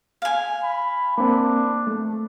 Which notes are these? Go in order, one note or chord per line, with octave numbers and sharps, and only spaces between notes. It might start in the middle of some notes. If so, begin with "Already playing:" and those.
F5 G#5
B5
A#3 C4 D4
A3